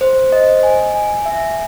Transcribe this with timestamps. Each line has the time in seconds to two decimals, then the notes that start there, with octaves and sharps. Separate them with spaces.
0.01 C5
0.32 D#5
0.63 G#5
0.95 G#5
1.26 E5